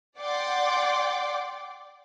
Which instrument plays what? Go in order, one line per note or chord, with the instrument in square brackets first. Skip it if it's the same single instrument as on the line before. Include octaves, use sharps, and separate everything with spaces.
[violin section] D5 F#5 G5 C6 D6